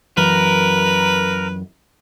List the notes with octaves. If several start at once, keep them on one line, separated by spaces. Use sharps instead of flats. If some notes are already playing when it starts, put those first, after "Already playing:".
F#2 E3 F#3 A#4 B4